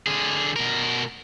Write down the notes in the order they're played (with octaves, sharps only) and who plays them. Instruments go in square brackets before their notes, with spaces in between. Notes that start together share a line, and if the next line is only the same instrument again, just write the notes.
[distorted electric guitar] D3 G#4
B2 A#4